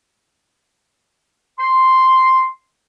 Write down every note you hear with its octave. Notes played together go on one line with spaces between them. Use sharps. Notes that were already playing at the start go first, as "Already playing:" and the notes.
C6